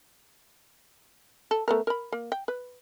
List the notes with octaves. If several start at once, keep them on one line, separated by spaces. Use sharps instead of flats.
A4
A3 B3 A#4
A#4 B5
A#3
G5
B4